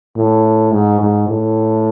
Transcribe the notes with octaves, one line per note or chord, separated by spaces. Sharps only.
A2
G#2
G#2
A2